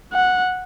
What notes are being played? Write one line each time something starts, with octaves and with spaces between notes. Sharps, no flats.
F#5